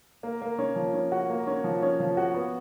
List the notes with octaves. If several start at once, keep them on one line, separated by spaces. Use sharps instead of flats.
A#3
A#3
C#4
F3
C#4
F#4
A#3
C#4
F3
C#4
F3
F#4
B3